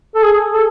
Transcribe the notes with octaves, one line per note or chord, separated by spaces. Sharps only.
A4
G#4
A4